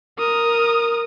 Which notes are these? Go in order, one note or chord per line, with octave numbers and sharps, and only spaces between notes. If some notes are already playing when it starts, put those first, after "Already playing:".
A#4 D#6